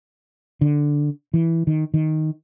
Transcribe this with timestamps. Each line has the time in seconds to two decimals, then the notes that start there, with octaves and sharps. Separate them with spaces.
0.61 D3
1.34 E3
1.67 D#3
1.94 D#3